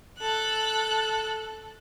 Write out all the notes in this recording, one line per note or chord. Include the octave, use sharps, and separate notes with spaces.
A4 F#6